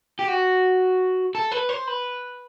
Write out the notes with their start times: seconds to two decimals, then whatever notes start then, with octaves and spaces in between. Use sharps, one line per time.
0.19 G4
0.28 F#4
1.35 A4
1.51 B4
1.69 C5
1.87 B4